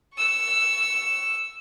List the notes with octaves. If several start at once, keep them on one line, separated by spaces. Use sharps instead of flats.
C#6 E6